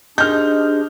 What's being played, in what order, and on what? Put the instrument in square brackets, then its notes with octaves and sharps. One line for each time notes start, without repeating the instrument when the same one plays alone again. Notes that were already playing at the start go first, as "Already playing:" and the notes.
[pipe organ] D4 G4 G#4 [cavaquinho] D#4 C5 D#5 [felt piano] F6 G6